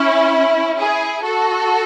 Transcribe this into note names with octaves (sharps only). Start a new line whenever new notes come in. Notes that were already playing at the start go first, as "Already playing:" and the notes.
Already playing: C#4 E4
E4 G#4
F#4 A4